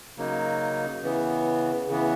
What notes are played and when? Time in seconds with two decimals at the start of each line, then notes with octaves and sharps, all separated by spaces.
0.17 C#3 F#3 A#3 D#4
1.03 C#3 E3 B3
1.88 C#3 E3 B3